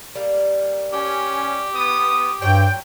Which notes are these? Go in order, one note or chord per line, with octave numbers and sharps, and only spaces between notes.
G3 A#3
C#4 G4
B3 D#6
G2 A#2 F#3 C5 G5